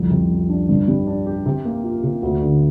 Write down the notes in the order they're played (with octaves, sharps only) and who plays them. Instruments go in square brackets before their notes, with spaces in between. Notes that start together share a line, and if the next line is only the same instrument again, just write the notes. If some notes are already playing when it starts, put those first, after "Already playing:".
Already playing: [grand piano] C2 F2
C3
F3
D4
G2
G3
D4
G4
C3
A#3
F4
C3
D2
D3